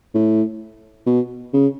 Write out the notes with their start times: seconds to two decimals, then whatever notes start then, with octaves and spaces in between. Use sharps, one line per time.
0.14 A2
1.06 B2
1.53 C#3